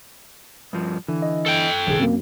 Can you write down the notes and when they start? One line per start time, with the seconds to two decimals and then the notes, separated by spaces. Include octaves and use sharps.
0.73 G2 F3
1.08 D3 E3
1.22 D#5
1.46 A4 G5
1.87 A#1 G2 C3 D#3 G#4
1.99 F#2 A#3 C4